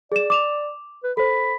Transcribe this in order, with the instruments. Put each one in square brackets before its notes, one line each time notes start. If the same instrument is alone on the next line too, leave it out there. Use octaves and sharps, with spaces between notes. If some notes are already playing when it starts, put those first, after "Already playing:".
[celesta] G#4 E7 [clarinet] D5
[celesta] D6 E7 F7
[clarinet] B4
[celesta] A4 C5 [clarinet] B5